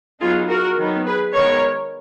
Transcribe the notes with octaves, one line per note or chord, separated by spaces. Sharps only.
F#3 B3 D#4 F4 G#4
F#4 A#4
D#3 F#3 B3 D#4
G#4 B4
D#3 G#3 B3 A#4 C#5